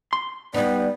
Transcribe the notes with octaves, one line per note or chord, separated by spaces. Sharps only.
C6
G3 B3 D#4 D5